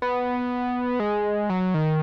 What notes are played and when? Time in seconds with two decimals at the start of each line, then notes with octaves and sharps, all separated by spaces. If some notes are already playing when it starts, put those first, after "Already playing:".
0.02 B3
1.00 G#3
1.50 F#3
1.74 D#3